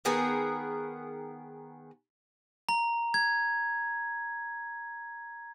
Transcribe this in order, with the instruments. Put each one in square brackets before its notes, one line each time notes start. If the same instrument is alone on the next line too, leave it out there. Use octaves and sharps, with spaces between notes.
[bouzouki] D#3 B3 G#4 A#4
[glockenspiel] A#5
G#6